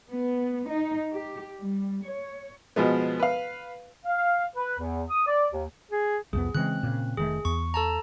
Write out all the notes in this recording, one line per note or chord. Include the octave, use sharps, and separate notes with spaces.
B3
D#4
G4
G3
C#5
B2 F3 G#3 B3
B4 F5
F5
B4
E2
D#6
D5
D#2
G#4
C2 F2 B3 G#4
C#3 E3 G#3 C4 F#6
A#2 C#3
F1 D#3 A3 G#4
E2 C#6
A4 A5 A#5